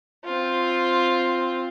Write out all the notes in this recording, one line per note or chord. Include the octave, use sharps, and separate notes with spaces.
C4 F4